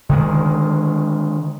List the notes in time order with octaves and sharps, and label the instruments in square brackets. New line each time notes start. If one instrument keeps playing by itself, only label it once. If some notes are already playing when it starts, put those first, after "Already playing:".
[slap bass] D3 D#3 G#3